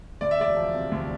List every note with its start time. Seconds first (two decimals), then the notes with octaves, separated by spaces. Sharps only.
0.21 D2 D5
0.31 E5
0.39 E1 D5
0.57 F3
0.74 C3
0.91 D2